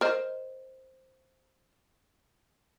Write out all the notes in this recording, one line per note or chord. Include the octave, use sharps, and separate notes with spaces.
A#4 C5 D#5